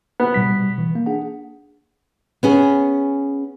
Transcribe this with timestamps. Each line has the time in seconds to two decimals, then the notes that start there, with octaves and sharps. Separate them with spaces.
0.20 B3
0.34 B2 G3 B6
0.78 E3
0.95 A#3
1.06 D4 G#4 F#5
2.43 B3 C#4 G#4